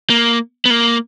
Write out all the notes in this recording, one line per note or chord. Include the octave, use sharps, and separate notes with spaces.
A#3
B3
A#3